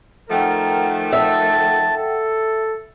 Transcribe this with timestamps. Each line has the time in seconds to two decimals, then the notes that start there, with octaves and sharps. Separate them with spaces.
0.30 D#3 F3 A3 A#4 F#5 G5
1.13 E5 A5
1.97 A4